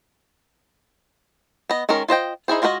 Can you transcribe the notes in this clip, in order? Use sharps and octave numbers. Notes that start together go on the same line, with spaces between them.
B3 D#5
D#3 G#3 C#4 A#4
F4 C5 D#5 G5
D#4 E4 G#4 C5
G#3 F4 F#4 B4 D#5